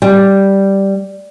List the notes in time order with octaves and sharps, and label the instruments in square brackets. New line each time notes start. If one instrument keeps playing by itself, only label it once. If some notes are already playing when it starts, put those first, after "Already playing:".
[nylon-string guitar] G3